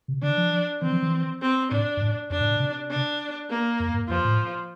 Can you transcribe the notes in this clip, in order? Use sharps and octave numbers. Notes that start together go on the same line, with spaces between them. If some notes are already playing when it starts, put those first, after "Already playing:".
C3
D3 D4
F3
E3 C4
F3
E3
C4
A2 D4
G2
A2
F2 D4
A2
A#2
C3
D4
A#3
F2
G2
F2 F3
A2